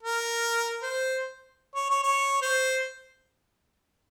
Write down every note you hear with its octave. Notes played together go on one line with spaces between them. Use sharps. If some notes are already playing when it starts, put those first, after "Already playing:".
A#4
C5
C#5
C#5
C#5
C5